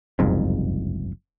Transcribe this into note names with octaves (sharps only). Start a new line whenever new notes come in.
F#1 C2 F2 G#2